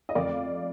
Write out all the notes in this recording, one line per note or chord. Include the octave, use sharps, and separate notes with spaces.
D#5
F2 D5 F5